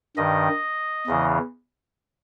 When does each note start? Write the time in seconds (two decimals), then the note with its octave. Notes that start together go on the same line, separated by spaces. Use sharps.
0.17 G2 D#3 D#5
1.07 E2 C#3 E3